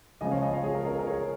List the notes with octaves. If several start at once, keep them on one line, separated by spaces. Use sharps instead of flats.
C#3 F3 G#3 F4 D#5 G#5
C#5 F5
D#5 G#5
C#5 F5
G#4
A#4
A#4
A#4
G#4 C#5